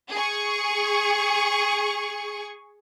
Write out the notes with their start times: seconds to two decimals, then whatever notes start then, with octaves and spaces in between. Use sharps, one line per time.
0.11 G#4 C#6